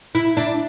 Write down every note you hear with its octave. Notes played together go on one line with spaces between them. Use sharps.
E4
D4